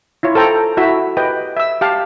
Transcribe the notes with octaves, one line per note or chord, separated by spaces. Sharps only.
E4 F4 C#5
A4 C5 G5 A#5
E4 F#4 E5
G4 B4 D#5 G5
E5 E6
G4 F5 A5